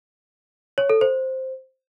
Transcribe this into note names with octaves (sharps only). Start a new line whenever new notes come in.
C#5
A4
C5